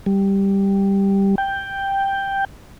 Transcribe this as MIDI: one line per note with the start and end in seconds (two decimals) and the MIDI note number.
0.06 1.35 55
1.38 2.45 79